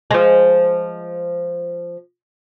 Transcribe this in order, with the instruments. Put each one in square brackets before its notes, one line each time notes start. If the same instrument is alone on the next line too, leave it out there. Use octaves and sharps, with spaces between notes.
[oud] F3 G#3